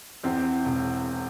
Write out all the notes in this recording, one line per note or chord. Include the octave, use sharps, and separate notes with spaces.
E2 C4
E1